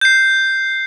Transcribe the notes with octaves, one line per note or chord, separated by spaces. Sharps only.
G6 C7